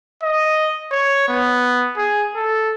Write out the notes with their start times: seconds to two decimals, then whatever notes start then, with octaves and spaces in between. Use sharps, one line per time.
0.23 D#5
0.92 C#5
1.28 B3
1.97 G#4
2.36 A4